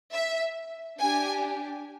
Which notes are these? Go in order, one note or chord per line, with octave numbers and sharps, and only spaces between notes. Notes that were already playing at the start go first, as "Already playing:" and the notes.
E5
D4 G4 G#5